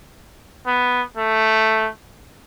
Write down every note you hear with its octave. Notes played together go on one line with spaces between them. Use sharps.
B3
A3